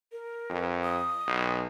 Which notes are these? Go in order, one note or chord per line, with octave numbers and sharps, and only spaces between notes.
A#4
F2
D#6
B1